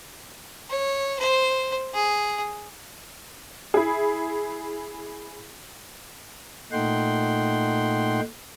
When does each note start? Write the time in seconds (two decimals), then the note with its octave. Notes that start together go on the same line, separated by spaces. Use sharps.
0.69 C#5
1.19 C5
1.94 G#4
3.74 E4 G#4
6.72 A#2 A3 D#4 F#5 G5 C6